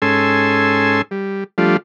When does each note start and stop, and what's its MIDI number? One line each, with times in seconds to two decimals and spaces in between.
0.02 1.02 44
0.02 1.02 61
0.02 1.02 69
0.02 1.02 80
0.02 1.02 84
0.02 1.02 88
1.11 1.44 55
1.58 1.77 53
1.58 1.77 55
1.58 1.77 57
1.58 1.77 62
1.58 1.77 65